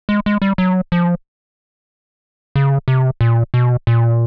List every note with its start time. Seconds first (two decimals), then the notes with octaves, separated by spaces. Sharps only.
0.09 G#3
0.26 G#3
0.42 G3
0.58 F#3
0.92 F3
2.56 C#3
2.88 C3
3.21 A#2
3.54 B2
3.87 A#2